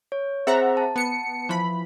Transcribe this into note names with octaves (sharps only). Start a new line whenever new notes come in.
C#5
C4 G#4 C5 E5 F#5 A#5
A5
B3 C#7
E3 F3 B5